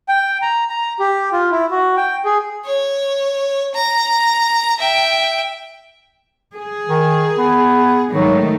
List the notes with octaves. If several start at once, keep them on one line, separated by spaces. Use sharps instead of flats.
G5
A#5
A#5
G4
F4
E4
F#4
G5
G#4
C#5
A#5
E5 G5
G#4
D#3
B3
G#2 D#3 F#3 A3